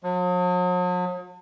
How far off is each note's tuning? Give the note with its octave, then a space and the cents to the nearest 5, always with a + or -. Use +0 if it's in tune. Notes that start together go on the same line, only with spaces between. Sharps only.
F#3 -45